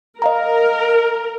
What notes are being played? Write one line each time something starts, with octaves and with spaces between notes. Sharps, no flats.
A#4 D#5 F5 A#5